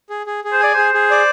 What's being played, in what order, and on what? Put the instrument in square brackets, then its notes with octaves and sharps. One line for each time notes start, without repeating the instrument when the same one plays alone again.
[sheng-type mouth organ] G#4
G#4
G#4
[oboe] C5
[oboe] D5 [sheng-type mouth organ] G#5
[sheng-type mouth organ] G#4 [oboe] C5
[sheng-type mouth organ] G#4
D5